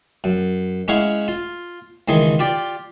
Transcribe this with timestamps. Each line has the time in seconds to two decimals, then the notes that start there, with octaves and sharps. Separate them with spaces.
0.24 F#2
0.88 G#3 C#4 E4 C#5 F5 F#5
1.28 F4
2.08 C#2 D#3 E3 G#4 C6
2.39 F4 G4 D5